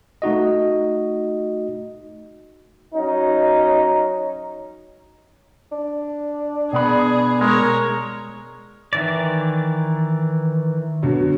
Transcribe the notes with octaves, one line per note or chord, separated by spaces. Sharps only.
A3 D#4 F#4 D#5
F#3 C#4 D#4
D4
B2 B3 G#4 B5
G#3 A#4 C#5
D#3 E3 D5
B2 D3 F#3